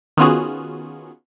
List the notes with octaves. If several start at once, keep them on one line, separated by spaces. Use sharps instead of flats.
D#3 B3 C#4 F4 F#4 G#4